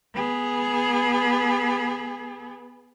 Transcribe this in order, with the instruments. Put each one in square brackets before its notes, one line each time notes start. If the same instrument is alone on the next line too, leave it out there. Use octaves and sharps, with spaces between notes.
[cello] B3 G#4